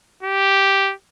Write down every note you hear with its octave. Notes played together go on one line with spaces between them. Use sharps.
G4